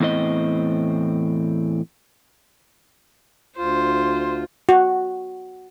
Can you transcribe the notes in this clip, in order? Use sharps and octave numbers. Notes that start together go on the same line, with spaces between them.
E2 A2 C4 D#5
D2 F4 C5
F#4